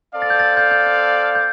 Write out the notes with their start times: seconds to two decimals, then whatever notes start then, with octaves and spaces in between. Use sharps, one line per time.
0.14 C4 A4 D5 F5
0.22 A6
0.30 G6
0.39 A6
0.57 G6
0.71 G6
0.86 G6
1.35 G6